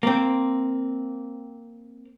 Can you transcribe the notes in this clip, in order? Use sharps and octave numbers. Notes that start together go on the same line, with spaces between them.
A#3 C4